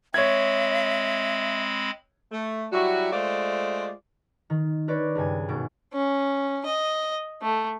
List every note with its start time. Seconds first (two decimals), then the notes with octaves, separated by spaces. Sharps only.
0.14 G#3 C4 C#5 E5 B5 G#6
2.31 A3
2.71 F#3 G3 E4 F#4
3.12 G#3 A3 F4 C5 D5
4.50 D#3
4.88 D4 A#4 B4 C#5 D5
5.15 C#2 G2 G#5
5.49 G#1 B2 D7
5.94 C#4
6.66 D#5
7.42 A3